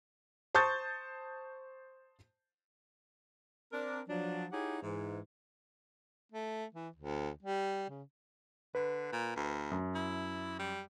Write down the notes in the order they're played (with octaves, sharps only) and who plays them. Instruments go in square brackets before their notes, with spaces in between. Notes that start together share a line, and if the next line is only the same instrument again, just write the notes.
[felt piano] C5 A5 C#6 D#6 G6 A6
[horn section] C4 D4 A#4
F3 F#3 D4
D#4 E4 G4 G#4 C#5 F#5
G#2 E3
[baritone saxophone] A3
E3
D2
G3
C#3
[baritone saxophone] D3 [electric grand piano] B4
[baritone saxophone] A#2
D2
[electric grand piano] F#2
[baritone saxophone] E4
G3